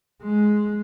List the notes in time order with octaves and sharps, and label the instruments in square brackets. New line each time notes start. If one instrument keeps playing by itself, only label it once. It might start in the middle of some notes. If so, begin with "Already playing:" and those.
[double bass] G#3